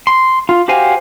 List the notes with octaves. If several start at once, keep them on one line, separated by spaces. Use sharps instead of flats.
C6
F4
F#4 G4 C5 F5 G#5